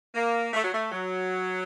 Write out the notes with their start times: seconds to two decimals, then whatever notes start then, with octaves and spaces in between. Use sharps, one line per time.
0.15 A#3
0.53 A3
0.63 F#3
0.73 A3
0.91 F#3